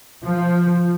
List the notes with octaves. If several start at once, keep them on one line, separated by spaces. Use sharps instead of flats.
F3